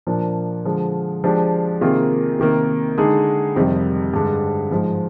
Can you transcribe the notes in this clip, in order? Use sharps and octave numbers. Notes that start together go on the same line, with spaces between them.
A#2 F3 A#3 D4
D3 F3 G#3
F3 G#3 D4 G4
C3 D#3 A#3 F4 G#4
C3 D#3 A#3
D3 G#3 D#4 G#4
F2 C3 D#3 G3
G2 D3 G#3
G#2 F3 G#3